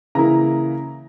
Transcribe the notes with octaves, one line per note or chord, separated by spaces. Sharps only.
C#3 E3 A#3 E4 A#5